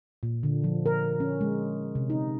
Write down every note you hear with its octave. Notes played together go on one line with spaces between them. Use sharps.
A#2
D3
F3
A#4
C#4
G#3
C3
D#4